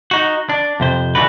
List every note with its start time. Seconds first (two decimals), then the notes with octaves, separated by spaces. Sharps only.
0.11 D#4 F#4
0.49 D4
0.80 F2 C3 C5
1.15 D3 E3 A3 D4 F#4 B4